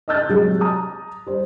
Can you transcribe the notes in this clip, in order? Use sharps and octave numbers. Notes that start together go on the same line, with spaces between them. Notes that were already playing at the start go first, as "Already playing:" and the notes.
D#5 A5 E6 F#6 G6 A6
C3 F#3 G#3 G#4
A#5 D#6
G3 C5